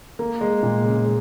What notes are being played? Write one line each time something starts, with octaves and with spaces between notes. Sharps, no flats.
A#3
G#3
A#2
C#3
G#3